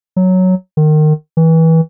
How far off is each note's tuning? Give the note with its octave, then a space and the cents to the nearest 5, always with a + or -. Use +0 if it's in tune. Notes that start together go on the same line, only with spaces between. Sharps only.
F#3 +0
D#3 -25
E3 -25